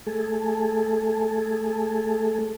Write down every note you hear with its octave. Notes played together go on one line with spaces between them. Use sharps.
A3 G#4 A4